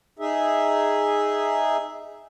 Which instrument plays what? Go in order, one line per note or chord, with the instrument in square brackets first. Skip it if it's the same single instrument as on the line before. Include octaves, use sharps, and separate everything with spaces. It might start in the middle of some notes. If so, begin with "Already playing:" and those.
[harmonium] D#4 G#4 E5